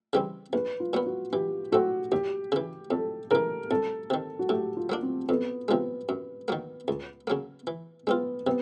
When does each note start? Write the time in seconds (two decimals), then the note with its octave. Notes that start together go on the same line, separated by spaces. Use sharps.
0.13 C#3 E3 G3 C4
0.53 A#1 B4
0.80 F4
0.93 A#2 F#3 B3
1.06 F#4
1.33 E3 G4
1.72 A3 C4 F#4
2.12 D#2 G4
2.52 C#3 E3
2.91 F2 A4
3.31 C#3 E3 A#4
3.71 C2 A4
4.10 C3 D#3
4.39 F#4
4.49 A2 G4
4.77 F4
4.89 F#3 A#3 D4
5.03 C4
5.29 F2 B3
5.68 C3 F3 G#3 B3
6.09 F#2
6.48 D#3 F#3 A#3
6.88 C#2
7.27 C#3 F#3 A#3
7.67 E3
8.07 G#3 B3 C4 F4
8.46 C3 B3